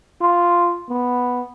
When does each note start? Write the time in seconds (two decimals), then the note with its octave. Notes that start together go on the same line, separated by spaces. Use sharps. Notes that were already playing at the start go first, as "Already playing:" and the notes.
0.21 F4
0.89 B3